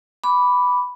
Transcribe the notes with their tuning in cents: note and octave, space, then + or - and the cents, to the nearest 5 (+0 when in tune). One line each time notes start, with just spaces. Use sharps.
B5 +0 D6 -10